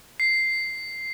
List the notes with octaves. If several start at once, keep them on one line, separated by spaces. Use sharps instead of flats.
C7